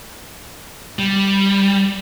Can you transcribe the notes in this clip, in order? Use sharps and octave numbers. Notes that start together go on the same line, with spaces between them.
G3